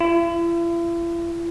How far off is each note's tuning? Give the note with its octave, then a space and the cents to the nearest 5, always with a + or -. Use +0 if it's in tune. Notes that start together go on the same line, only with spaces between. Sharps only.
E4 +45